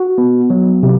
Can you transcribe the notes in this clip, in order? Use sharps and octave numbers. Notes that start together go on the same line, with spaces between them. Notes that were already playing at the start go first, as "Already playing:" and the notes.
Already playing: F#4
B3
F#3
C3